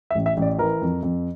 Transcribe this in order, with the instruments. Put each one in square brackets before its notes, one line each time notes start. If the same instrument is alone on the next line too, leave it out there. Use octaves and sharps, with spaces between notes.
[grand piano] E5
A1
E5
A1
D5
E3 A#4
F2
F2